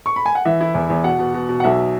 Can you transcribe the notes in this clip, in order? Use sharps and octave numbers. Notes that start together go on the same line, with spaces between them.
C#6
B5
G#5
F#5
E3 E5
E4
E2
E2
B2 F#5
B2
B2
B2
F#5
B1 E5